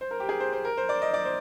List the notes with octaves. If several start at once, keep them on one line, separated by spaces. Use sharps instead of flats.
C5
A#4
G4
G#4
C5
C5
A#4
C5
D5
D#5
D5
C5